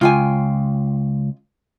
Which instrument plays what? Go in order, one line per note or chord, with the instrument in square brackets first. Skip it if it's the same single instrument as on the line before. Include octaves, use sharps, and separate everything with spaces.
[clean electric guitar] C#2 [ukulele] F4 G5 G#5